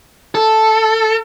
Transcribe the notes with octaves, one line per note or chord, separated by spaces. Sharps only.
A4